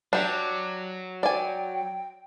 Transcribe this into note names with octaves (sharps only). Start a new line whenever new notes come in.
F#3 D4 G4
D5 G5 G#5